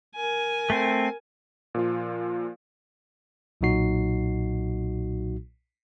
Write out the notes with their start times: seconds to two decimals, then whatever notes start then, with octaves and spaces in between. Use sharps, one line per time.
0.16 A#4 G#5
0.70 A3 C4
1.74 A#2 F3 F4
3.61 B1 A#2 F#3 D#4 F#4 C7